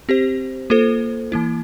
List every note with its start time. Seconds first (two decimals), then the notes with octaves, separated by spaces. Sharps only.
0.09 C4 G4 C5
0.70 A#3 F4 A4 C5
1.32 E3 A#3 E4